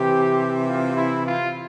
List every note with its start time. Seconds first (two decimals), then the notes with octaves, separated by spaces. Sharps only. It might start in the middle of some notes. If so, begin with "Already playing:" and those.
Already playing: C3 E3 G4
0.67 F4
0.95 E4
1.25 F4